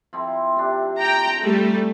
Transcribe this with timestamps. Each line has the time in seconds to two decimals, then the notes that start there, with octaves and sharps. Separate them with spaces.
0.13 F3 C4 E4
0.56 C3 D4
1.01 G5 A#5
1.42 G3 A3